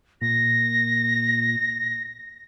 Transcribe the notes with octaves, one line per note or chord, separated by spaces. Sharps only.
A#2 A#6